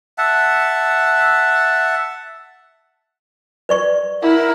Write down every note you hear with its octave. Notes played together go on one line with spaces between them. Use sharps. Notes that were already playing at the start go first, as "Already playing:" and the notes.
E5 F#5 A5
B4 D5 C#6
E4 A#4 F#5